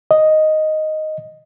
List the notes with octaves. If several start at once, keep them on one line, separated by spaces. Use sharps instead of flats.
D#5